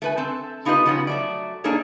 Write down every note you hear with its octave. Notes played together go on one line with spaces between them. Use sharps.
A3 B4 G#5
C4 A4
B3 D#4 F4 G4 B4 D#5
C#3 F3 B3 C#4 F#4
F#3 A3 D5
A#3 D4 D#4 G#4 A4 C#5